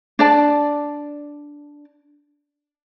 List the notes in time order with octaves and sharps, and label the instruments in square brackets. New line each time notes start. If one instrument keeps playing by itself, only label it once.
[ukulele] D4 D5 A5